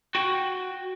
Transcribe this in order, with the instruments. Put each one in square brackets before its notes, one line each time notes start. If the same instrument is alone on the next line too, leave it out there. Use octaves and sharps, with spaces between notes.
[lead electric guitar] F#4 G5